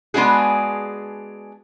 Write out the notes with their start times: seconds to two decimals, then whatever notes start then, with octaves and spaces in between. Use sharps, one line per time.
0.14 G#3 B3 D4 F#4 G#4